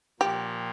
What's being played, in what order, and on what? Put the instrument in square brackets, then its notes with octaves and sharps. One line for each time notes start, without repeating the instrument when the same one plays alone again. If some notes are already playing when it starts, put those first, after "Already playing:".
[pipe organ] A#2 F3 A#3 [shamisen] G4